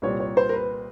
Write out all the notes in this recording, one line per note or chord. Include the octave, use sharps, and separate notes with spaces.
C2 A#2 G3 C#5
C#5
C5
A#4
B4